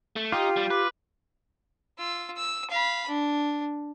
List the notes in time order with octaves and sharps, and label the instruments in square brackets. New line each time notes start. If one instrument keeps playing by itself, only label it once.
[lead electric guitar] A3
[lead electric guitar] D#4 [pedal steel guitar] F4 [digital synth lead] G4 [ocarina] G5
[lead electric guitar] G3
[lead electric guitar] B4 [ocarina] D6
[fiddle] F4 E6
E6
F5 B5
D4